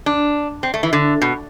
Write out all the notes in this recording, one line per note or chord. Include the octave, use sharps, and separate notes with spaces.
D4
C4
A3
E3
D3
B2